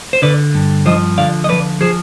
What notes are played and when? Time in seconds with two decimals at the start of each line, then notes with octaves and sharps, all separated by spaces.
0.13 C5
0.22 D3 B4 D5
0.55 G2
0.86 F3 C5 D#5
1.18 D3 D5 F5
1.44 D#5
1.49 F3 B4 D5
1.81 F3 G#4 C5